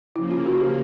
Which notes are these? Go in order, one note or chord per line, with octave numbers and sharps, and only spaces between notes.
C#3 F3 A#3 E4
F4
F#4
G4